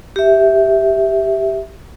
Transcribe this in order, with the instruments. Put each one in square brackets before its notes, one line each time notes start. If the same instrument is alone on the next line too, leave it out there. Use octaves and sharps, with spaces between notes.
[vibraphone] G4 E5